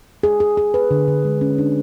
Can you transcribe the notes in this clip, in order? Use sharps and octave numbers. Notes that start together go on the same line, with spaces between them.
G#4
G#4
G#4
B4
D3
D3
G#3
C#4
D4